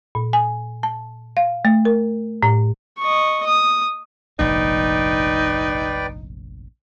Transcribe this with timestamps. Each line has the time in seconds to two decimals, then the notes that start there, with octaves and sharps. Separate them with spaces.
0.15 A#2
0.33 G#5
0.83 A5
1.37 F5
1.65 A3
1.85 A#4
2.43 A2
2.98 D#5 C#6
3.47 D#6
4.39 F1 A#1 G#2 D#4 B4 D5 G5